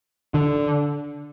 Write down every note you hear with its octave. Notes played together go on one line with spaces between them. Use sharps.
D3